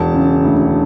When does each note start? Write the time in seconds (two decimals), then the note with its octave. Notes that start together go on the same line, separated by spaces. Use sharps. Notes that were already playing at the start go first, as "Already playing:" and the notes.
Already playing: E1 A5
0.14 C#3
0.45 D2